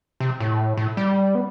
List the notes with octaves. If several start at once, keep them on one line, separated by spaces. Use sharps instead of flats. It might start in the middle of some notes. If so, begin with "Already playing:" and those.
C3
A2
A2
G3
B3